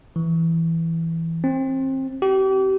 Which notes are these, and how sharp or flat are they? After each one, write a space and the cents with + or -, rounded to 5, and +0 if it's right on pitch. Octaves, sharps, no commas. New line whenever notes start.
E3 +0
C4 +25
G4 -35